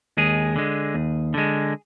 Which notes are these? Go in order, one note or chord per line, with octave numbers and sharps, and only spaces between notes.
D#2 G#3 G#4
D3 G#3
D#2
D3 G#3